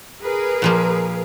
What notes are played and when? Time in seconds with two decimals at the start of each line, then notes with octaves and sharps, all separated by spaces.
0.22 G#4 A#4 B4
0.62 A#2 F3 A#3